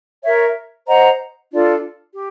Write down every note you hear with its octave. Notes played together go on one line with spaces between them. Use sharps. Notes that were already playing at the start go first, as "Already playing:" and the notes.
A#4 C#5 E5
C5 D#5 F#5 A#5
D4 F4 A4 D5
G4